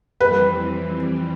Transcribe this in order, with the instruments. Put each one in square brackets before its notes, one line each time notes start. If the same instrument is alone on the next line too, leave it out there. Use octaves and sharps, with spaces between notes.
[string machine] F2 E3 G3 C4 [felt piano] B4